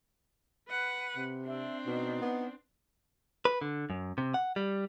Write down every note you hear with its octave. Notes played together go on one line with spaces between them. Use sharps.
B4 F#5
C3
C4 D4 E5
B2 D#4
B3
B4
D3
F#2
C3
F#5
G3